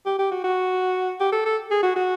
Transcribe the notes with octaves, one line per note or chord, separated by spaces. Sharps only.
G4
G4
F#4
F#4
G4
A4
A4
G#4
F#4
F#4